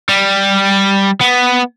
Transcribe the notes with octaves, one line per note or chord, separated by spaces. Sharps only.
G3
B3